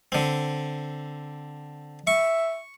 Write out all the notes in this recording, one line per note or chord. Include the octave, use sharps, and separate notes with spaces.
D3 C4
E5 C#6